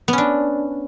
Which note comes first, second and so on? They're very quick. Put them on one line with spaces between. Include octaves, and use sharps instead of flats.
B3 C#4 D4